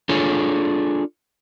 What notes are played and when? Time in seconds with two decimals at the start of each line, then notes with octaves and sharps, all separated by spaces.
0.09 D4 F4 G#4 A4 C#5